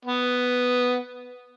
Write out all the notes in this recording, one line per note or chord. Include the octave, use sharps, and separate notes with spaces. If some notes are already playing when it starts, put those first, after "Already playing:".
B3